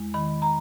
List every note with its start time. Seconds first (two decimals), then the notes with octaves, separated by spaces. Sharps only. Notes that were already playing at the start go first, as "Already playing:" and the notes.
Already playing: E2 G#3
0.14 D#3 B5
0.42 A#5